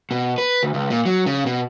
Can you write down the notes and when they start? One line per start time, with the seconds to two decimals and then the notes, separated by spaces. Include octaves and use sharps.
0.11 B2
0.38 B4
0.63 D2
0.74 C#2
0.90 A#2
1.06 F#3
1.26 C#3
1.46 B2